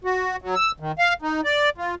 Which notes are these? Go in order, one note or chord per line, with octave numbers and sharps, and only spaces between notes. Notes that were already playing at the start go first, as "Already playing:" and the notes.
F#4
F#3
E6
D#3
F5
D#4
D5
F4